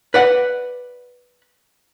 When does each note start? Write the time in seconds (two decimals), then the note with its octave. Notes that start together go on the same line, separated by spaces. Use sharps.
0.14 B4 D5 F#5